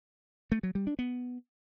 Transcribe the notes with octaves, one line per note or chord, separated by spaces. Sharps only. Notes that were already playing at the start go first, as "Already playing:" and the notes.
A3
F#3
G3
D4
B3